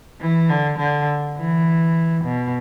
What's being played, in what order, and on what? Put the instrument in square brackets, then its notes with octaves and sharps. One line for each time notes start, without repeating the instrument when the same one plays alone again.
[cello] E3
D3
D3
E3
B2